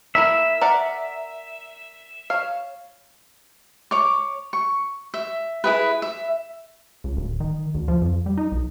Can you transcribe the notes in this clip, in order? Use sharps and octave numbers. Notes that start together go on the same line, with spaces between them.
A#3 E4 A#4 E5
A#4 D5 F#5
C#5 F5
C#5 D6
C#6
E5
E4 G#4 B4
E5
C#2
D1
D#3
D2
F3
F2
G3
D#4
B1